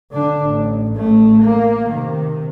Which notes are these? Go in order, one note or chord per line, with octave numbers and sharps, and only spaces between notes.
D3 D4
A1
A1 A3
A#3
C3 D#3